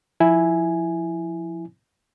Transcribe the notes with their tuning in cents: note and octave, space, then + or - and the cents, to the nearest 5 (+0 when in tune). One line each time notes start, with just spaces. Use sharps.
F3 +0 E4 +0 G#5 +0